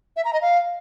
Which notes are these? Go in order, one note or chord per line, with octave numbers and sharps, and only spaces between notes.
E5
A#5
D#5
F5